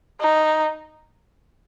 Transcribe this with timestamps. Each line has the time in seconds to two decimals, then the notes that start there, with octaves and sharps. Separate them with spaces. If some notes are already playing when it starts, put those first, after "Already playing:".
0.21 D#4